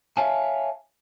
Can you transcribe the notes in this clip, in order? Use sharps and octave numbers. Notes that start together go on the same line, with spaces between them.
C#5 E5 F5 G#5 A5